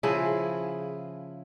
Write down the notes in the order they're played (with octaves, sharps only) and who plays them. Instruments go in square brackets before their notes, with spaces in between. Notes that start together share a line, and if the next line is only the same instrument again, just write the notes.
[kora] C#3 F3 E4 G#4